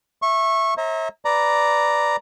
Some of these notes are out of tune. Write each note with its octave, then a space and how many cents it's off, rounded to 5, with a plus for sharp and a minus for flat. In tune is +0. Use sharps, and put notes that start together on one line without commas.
E5 +5 C#6 -20
C#5 -45 E5 -35 A#5 -5
B4 +0 D5 +0 A#5 +0